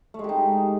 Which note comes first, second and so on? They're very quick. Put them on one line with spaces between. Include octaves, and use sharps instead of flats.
A3 G#3 G4 D#4